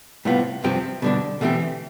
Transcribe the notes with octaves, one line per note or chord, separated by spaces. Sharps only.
A2 C3 G3 B3 F4
G2 C3 F3 C4 G4
B2 D3 G3 D4
B2 E3 A3 C4 G4